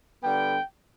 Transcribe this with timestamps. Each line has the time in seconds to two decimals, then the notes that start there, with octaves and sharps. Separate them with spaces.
0.22 D3 G3 B3 G5